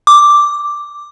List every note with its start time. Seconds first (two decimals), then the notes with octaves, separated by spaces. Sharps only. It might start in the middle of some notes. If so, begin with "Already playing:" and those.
0.07 D6